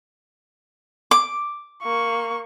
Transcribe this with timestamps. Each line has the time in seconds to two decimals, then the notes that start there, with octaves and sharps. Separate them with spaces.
1.11 D6
1.83 A#3 C#6